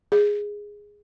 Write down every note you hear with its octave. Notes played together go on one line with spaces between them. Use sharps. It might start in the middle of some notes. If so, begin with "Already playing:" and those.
G#4